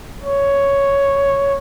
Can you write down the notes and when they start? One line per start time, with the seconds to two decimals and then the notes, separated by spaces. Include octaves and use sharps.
0.24 C#5